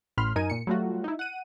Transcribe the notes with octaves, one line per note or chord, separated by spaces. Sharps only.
A1 A2 B5 C6 F6
F#2 D#4 A#4 G#5 D#7
A#2 C#7
F#3 G3 A3 F4 F#4
D#4 E4
F#5 D#7